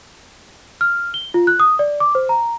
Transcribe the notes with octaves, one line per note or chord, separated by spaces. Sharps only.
F6
G7
F4
F#6
D#6
D5
D6
C5
A#5